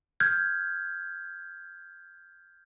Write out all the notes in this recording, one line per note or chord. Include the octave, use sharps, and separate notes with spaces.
F6 G6 G#6